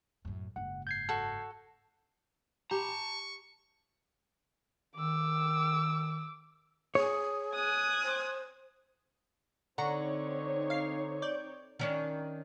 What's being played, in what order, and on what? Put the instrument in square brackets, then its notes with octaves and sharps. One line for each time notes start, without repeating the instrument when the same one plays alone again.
[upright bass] F#2 A2
[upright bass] F#1 G#2 [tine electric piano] F#5
[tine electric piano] G6 G#6 C7
[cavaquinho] F#4 A4
[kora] G4 [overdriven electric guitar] A5 A#5 [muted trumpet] C#6
[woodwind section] D#3 [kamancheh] D6 E6
[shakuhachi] G#4 [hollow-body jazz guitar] C#5
[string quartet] G#5 D#6 F#6
[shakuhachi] C5
[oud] D3 [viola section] C4 D#4 C#5 [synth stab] F#5 A#5 C#6
[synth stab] F5 C7
D5 G6
[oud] D#3 C#4 D4